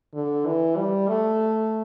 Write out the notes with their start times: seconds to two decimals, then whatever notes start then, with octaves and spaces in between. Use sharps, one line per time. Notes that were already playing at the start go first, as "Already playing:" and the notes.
0.14 D3
0.46 E3
0.77 G3
1.09 A3